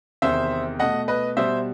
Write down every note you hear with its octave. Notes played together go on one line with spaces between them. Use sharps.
E2 C3 D#3 C5 E5
B2 A3 D#5 F#5
B4 D#5
B2 G3 C5 E5